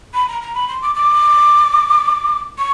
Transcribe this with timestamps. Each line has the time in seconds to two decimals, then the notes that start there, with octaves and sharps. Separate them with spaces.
0.14 B5
0.29 A#5
0.42 A#5
0.55 B5
0.68 C6
0.82 D6
0.95 D6
2.58 C#6